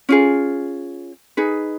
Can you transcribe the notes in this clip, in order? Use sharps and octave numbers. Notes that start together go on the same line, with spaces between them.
C#4 F4 G#4
D#4 G#4 B4